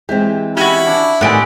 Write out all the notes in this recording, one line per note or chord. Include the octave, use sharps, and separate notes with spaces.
E3 G#3 C4 G4
C#4 E4 F#4 G4 B5
D4
A2 D#3 B3 C4 G4 D5 F#5 G#5